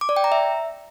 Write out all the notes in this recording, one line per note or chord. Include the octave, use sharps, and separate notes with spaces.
D6
D5
G5
A#5
E5